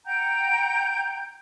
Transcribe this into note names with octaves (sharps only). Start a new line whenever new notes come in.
F#5 G5 A#5 G6